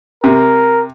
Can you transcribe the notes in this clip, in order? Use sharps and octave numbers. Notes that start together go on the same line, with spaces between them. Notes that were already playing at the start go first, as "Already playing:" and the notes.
C3 A#4